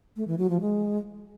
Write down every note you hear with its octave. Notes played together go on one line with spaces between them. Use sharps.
A3
E3
F#3
F3
G#3